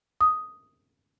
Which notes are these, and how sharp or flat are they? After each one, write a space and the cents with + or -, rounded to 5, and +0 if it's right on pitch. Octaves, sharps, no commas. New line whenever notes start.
D#6 +5